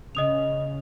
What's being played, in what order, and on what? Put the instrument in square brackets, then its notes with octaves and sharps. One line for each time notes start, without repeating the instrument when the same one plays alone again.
[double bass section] C#3 [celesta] D#5 D#6 F7